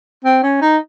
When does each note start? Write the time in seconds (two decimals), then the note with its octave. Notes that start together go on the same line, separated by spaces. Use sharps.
0.25 C4
0.43 C#4
0.61 D#4